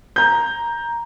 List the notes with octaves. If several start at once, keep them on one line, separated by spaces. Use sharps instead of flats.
A#5 G6